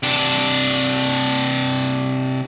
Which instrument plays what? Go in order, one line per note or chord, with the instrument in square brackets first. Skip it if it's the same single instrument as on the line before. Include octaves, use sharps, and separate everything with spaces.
[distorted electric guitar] C3 D4